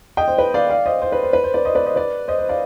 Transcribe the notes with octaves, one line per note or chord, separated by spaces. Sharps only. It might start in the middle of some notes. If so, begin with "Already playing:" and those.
D#5 G5
C5
B4
D5 F5
D5 F5
C5 D#5
C5
B4
C5
B4
C5
B4 D5
C5 D#5
B4 D5
C5 D#5
B4 D5
C5 D#5
C5
D5 F5